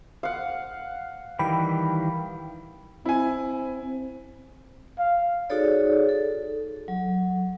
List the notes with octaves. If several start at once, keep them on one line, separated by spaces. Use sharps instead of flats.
F5 F#5
D#3 E3 G3 G5 B5
C4 E4 G#5
F5
D#4 F#4 G#4 A4 C#5 D5
A4
F#3